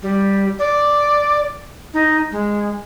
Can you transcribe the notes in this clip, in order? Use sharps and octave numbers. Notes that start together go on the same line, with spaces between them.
G3
D5
D#4
G#3